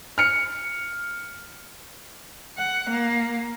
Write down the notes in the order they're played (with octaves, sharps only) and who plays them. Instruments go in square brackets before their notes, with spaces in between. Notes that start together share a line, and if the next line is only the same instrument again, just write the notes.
[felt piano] F6 C#7
[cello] F#5
A#3